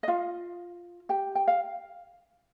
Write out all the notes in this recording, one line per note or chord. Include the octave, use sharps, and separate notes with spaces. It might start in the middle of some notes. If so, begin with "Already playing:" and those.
D#5
F4 F5
G4 G5
G5
F5